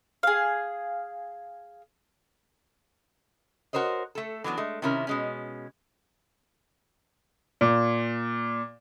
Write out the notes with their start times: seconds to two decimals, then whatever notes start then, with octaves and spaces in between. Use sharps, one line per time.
0.23 G#4 F5
3.73 F#4 A#4 C5 C#5 D#5
4.15 A3 A4
4.44 E3 F#3 B3 D4
4.57 G#3 A3
4.82 C3 D#3 C#4 E4 G4 A#4
5.07 B2 G#3 C#4
7.61 A#2